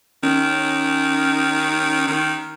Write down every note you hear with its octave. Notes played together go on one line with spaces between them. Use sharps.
D#3 C#4
D#3